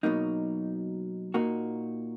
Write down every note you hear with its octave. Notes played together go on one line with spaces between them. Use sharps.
B2 F#3 A#3 D#4
A#2 A#3 D#4 F#4